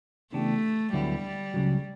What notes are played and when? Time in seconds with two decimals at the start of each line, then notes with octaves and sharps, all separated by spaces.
0.33 C#3 E3 A3 B3 D4 G4
0.93 D2 D3 F#3 G3 B3 E4
1.54 C#2 C#3 F#3